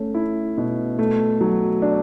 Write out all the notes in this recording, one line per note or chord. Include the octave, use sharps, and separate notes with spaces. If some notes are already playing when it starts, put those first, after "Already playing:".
Already playing: A3 C#4
E4
B2
A3
F#3
D4